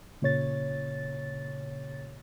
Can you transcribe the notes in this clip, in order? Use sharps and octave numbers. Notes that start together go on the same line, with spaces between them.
A#2 C#3 C#5 A6